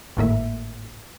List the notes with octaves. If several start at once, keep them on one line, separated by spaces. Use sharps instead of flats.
G#1 A2 A#3 E5